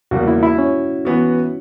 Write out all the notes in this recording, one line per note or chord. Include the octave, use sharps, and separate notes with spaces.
E2 C#3 G3 A#3 F#4
E4
E4
C#4
E3 B3 F#4